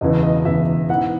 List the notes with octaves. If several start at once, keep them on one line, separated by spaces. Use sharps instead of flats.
E1 E2 C#3 E3 D#5
D#5
E1 E2 C#3 E3 E5
G#2 E3 B3 F#5